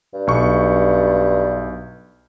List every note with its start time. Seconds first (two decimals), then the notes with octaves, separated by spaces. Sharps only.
0.13 G2
0.27 B1 C#6